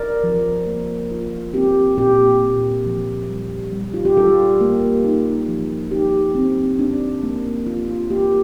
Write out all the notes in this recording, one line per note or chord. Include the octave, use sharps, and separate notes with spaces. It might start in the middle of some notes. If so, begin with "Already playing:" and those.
Already playing: A#4 D5
F3
A#3
F4
C4 G4
A#2 G4
A#2
F3
G3
G3
F4
G4
G3 F4 A4
A#3
D#4
F3
D#4 G4
C4
D4
A#3
F4
F4
A#3 G4